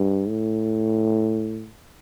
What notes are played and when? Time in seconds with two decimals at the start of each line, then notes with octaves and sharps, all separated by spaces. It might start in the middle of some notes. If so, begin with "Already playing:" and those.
Already playing: G2
0.29 A2